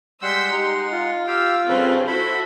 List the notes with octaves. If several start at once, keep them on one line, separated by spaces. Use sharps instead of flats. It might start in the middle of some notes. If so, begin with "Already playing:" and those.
G3 G#3 F#5 C6 E6 G6 B6
D#4 G4
F4
G4 F5 G5 E6
G2 C#3 C4 A4 B4
E4 F#4 A4 C5 B5